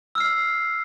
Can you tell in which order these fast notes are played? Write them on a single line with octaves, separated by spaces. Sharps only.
E6 F6 C7